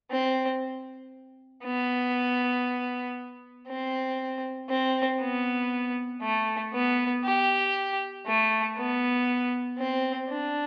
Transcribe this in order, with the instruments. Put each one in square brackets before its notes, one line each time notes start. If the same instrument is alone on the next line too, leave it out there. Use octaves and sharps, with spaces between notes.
[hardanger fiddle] C4
B3
C4
C4
B3
A3
B3
G4
A3
B3
C4
D4